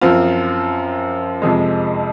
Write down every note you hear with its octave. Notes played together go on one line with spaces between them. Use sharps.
F#2 F3 C4 F4
F2 C3 F3 G#3